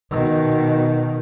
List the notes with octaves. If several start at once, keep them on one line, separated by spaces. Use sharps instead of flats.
B2 D#3